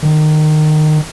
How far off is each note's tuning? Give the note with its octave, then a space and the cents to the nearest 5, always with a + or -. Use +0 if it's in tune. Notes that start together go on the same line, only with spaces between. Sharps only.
D#3 -20